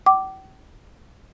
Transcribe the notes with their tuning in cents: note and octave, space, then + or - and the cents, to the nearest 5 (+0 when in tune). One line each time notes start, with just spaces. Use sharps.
G5 -45 D6 +0